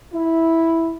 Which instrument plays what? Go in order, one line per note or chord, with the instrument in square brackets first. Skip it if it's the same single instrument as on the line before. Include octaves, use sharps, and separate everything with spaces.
[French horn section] E4